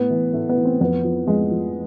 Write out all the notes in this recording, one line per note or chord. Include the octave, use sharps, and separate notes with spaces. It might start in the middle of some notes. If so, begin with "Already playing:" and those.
Already playing: A2 B3
E3
A2 A3
B3
E3
C4
F2 B3
F3
F2 G#3
F3